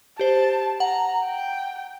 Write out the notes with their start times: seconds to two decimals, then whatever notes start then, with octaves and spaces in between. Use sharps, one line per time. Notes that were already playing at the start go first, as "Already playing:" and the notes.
0.19 G4 C5 A5
0.80 F#5 A#5
1.25 G5